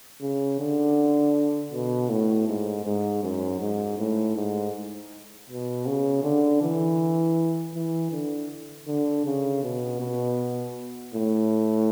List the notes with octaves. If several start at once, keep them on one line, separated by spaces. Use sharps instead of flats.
C#3
D3
B2
A2
G#2
G#2
F#2
G#2
A2
G#2
B2
C#3
D3
E3
E3
D3
D3
C#3
B2
B2
A2